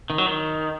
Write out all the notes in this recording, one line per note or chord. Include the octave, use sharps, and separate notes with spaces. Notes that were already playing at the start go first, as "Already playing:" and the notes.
D#3
F#3
D#3